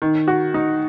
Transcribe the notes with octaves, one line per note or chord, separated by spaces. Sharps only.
D#3
F#4
D#4